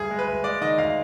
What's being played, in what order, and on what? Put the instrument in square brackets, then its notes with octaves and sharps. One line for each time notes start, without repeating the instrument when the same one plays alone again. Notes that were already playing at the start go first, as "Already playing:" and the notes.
Already playing: [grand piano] D2 G2 G#4
G#3
B4
D2
G#3 D5
D#3 D#5
D2 F5